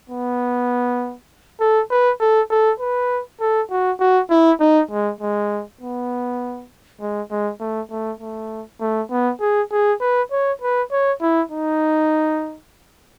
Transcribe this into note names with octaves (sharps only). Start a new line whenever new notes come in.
B3
A4
B4
A4
A4
B4
A4
F#4
F#4
E4
D#4
G#3
G#3
B3
G#3
G#3
A3
A3
A3
A3
B3
G#4
G#4
B4
C#5
B4
C#5
E4
D#4